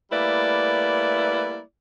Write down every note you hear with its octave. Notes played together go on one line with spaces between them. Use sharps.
G3 A3 A#3 E4 B4 D5